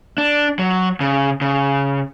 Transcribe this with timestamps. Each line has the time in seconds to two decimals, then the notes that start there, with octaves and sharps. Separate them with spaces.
0.18 D4
0.59 F#3
1.00 C#3
1.41 C#3